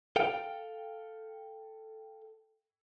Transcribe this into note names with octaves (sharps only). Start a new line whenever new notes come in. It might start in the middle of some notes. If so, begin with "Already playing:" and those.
A4 F5 G5